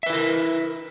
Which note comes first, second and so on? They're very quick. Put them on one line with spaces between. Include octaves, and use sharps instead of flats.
E5 B4 E4 A#4